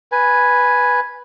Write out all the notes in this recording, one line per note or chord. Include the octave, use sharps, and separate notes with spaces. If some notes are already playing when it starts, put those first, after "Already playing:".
B4 G#5